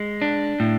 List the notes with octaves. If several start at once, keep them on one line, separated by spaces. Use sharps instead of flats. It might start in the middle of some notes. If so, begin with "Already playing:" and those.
Already playing: G#3
D4
A2